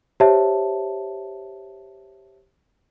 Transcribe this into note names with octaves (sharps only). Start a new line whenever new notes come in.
G4 C5 C#5 E5 A5